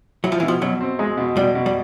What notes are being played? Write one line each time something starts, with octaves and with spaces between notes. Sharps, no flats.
F#3 E4
F3
E3
B2
F3
B2 F#3
C4
G#3
B2
B2 G3
B2
G3